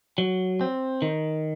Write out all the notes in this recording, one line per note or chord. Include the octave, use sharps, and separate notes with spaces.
F#3
C4
D#3